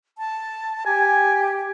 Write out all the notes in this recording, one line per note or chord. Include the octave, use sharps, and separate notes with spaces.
A5
G4 G#5